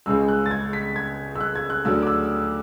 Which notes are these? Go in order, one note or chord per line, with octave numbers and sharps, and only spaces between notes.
C#2 C#3 G#3 E6
F#6
A6
G#6
B6
G#6
E6
F#6
G#6
F#6
D2 D3 F#3 E6
D6
E6